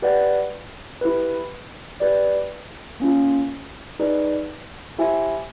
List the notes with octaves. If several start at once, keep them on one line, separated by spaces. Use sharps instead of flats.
G4 B4 D5 F#5
E4 G4 B4
G4 B4 D5
A#3 C#4 F4
D#4 G#4 B4 D5
E4 G4 C5 E5 G#5